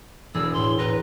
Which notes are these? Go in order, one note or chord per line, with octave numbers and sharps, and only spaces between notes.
E1 E4 G#4 E6
A2 C6
A2 A#4 B4